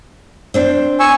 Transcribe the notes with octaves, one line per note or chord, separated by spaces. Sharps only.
C4 D4 C5
G#5 C#6 E6